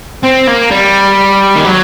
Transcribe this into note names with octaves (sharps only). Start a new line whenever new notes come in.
C4
A#3
G3
D#3
F#3